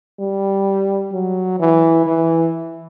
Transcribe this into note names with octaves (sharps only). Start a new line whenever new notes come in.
G3
F#3
E3
E3